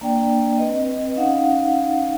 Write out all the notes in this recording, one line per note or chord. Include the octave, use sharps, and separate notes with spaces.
A#3 D4 D5 G5
C4 B4 D#5
C#4 D#4 F5 F#5